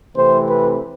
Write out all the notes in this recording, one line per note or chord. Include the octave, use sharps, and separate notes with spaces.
C3 E3 A3 C4 C5
B4